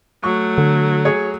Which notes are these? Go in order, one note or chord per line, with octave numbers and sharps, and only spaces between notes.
F#3 A3 C#6
D3
G#4 C#5